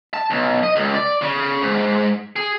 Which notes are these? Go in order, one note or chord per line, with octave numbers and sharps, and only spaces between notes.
A5
B1
D#5
C#2
D5
C#3
G#2
G#4